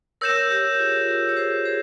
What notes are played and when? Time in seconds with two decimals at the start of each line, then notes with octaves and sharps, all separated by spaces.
0.21 A#4 C#5 E6 G6 A#6 E7
0.50 G4 A#4
0.79 F4 G#4
1.08 G4 A#4
1.29 C#5
1.36 G#4 C5
1.65 G#4 C5